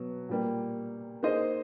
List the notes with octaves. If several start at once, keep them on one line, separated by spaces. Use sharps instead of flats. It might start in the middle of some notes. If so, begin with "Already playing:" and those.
Already playing: B2 F#3 B3
A#2 G3 A#3
A#3 D#4 G#4 C5 D#5